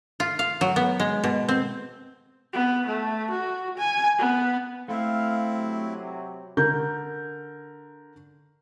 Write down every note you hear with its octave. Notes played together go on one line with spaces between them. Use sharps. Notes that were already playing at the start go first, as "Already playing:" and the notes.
F4
F5
F#3
B3
G#3
B2
C4
B3
A3
F#4
G#5
B3
A3 C4 E4 F5
C3 F#3
D3 A#4 G6